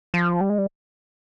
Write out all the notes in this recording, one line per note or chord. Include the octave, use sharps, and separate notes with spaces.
F3
G3
G#3
G3